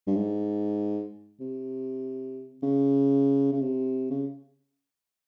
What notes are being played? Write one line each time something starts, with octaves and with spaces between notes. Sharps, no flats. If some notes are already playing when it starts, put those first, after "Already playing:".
G2
G#2
C3
C#3
C#3
C3
C#3